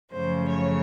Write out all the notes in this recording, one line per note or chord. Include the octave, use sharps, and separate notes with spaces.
F#2 C#3 F3 A3 C5
C#5